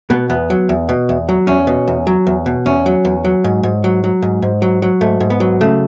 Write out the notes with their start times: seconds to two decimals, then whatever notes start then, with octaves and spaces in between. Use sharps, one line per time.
0.10 B2 B3
0.30 E2 B3
0.50 F#3
0.69 E2
0.89 B2
1.09 E2
1.29 F#3
1.47 E2 C#4
1.67 B2
1.88 E2
2.07 F#3
2.27 E2
2.46 B2
2.66 E2 C#4
2.86 F#3
3.05 E2
3.25 F#3
3.44 G#2
3.63 G#2
3.84 F#3
4.04 F#3
4.22 G#2
4.42 G#2
4.62 F#3
4.82 F#3
5.01 G#2 A3
5.20 G#2
5.30 B3
5.40 F#3
5.61 C#3 A3